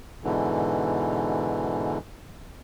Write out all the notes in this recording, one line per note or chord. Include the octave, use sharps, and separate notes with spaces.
G#2 B2 D3 E3